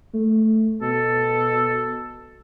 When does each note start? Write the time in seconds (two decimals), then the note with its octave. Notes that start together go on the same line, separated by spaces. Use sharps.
0.14 A3
0.81 B2 A4